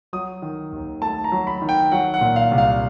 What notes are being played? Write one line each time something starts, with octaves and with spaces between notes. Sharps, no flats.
F#3 D#6
D#3
D#2
A3 A5
A#5
F#3
B5
D#3
G5
F#3 F#5
F#5
A#2
F5
C2
F5